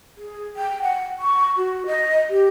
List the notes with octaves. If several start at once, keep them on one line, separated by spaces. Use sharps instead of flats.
G#4
G5
F#5
C#6
F#4
D#5
G4